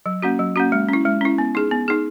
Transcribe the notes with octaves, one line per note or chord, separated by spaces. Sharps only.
F#3
A#3 C#4 F#4
F#3
A#3 C#4 F#4
G#3
C#4 E4
G#3
C#4 E4
B3
D#4 G#4
B3
D#4 G#4